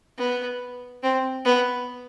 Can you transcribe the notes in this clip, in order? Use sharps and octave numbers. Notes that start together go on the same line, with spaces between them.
B3
C4
B3